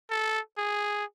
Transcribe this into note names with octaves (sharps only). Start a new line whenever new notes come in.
A4
G#4